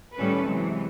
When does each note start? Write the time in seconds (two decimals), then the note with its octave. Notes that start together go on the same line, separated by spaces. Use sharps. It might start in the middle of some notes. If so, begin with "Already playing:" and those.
0.17 A2 D#3 G3 C#4 A4 B4
0.46 C3 E3 F#3 G#3